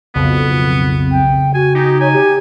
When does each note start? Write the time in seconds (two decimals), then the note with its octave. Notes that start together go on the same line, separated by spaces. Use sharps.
0.15 B1 F2 C#3 B3
1.11 G5
1.54 F#4 G#5
1.75 D#4 G4
2.01 C#5 G#5
2.13 G4